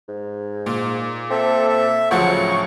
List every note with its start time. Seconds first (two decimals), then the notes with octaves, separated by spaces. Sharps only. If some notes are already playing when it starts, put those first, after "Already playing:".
0.08 G#2
0.66 A#2
1.30 C4 A4 E5
1.69 E5
2.11 D2 C#3 F3 F#3 F#5 C#6
2.35 A2